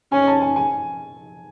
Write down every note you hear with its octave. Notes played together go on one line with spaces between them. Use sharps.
C#4 G#5
A5
G#5
G#5